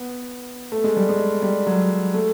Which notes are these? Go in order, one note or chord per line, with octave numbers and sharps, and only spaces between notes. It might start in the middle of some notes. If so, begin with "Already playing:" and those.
Already playing: B3
A3
G#3
G3
G#3
G3
F#3
A3